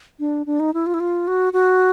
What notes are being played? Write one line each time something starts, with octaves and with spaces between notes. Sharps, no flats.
D4
D4
D#4
E4
F4
E4
F4
F#4
F#4